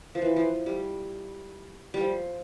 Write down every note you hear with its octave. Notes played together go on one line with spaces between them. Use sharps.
F3
E3
F3
G3
G3
F3